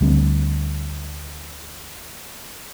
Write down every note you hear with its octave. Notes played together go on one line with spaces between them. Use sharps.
D2 G3 C4